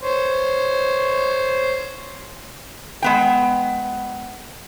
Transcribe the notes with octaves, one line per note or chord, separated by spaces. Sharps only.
C5 C#5
G#3 B3 G5